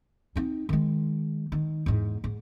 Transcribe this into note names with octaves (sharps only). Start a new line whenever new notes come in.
C4 D#4
D#3 G#3
D#3
E2 G#2
G#2